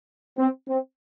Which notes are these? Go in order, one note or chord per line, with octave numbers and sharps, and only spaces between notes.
C4
C4